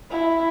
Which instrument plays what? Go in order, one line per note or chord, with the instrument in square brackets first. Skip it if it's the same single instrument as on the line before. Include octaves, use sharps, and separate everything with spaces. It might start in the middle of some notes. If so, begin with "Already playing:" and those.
[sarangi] E4